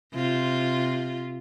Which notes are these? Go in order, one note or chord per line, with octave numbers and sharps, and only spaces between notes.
C3 F4